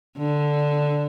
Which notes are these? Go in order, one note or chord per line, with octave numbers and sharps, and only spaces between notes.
D3